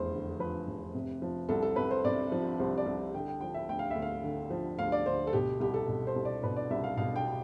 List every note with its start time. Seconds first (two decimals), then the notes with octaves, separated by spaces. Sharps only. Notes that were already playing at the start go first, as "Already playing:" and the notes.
Already playing: F1 E2 C5
0.13 D3
0.39 F3 B4
0.67 F1
0.94 C3
1.22 F3
1.49 C2 A4
1.63 A4
1.76 C2 B4
1.91 C5
2.05 C3 D5
2.32 F3
2.60 C2 C5
2.78 D5
2.86 C2
3.14 D3 G5
3.28 G5
3.41 F3 G5
3.54 E5
3.68 D2 G5
3.79 F5
3.91 D2 E5
4.02 F5
4.24 D3
4.50 F3
4.79 D2 F5
4.92 D5
5.06 D2 C5
5.27 A4
5.33 B2 G4
5.60 C2 G4
5.74 A4
5.87 B2
6.07 C5
6.16 C2
6.25 D5
6.43 B2 B4
6.56 D5
6.70 C2 E5
6.84 F5
6.97 B2 F5
7.16 G5